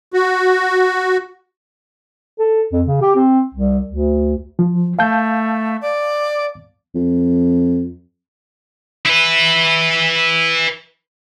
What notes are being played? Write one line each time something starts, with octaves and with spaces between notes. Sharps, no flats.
F#4
A4
F2
C#3
G4
C4
C2
D2
F3
A3 F5 A5 G6
D5
F2
E4 B4